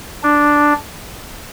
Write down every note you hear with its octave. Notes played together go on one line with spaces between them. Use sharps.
D4